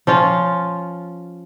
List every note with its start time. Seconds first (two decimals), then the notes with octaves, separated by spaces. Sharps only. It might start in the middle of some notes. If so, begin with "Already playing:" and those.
0.07 F3 C#4 F4